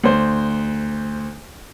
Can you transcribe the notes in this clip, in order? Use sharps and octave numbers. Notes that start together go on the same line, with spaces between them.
D2 C5